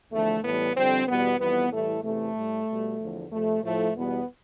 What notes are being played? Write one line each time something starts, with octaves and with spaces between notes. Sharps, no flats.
E2 D3 F3 A3
A2 E3 G3 B3
F2 D3 G3 C4
E2 B2 G3 B3
F2 E3 G3 B3
A2 E3 G3 A3
E2 C3 E3 A3
A2 G3
B2 G3
E2 D3 F3
F2 C3 F3 A3
A2 F3 A3
E2 B2 G3 B3